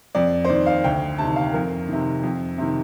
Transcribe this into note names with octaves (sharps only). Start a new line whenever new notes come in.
F2 D5
C5
D#3 D5
F5
D2 G5
C3 D#3 A5
F5
F2 A#4
C3 D#3
F2
C3 D#3